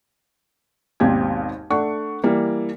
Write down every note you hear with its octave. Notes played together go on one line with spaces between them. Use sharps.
G#1 D#2 B2 C4 G4 G#6
A3 D4 F#5 C#6
E3 G3 A#3